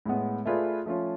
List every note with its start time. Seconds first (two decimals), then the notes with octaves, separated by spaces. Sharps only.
0.06 A2 G#3 B3
0.45 A3 F4 G#4 B4 D5
0.86 F3 A3 C#4 F4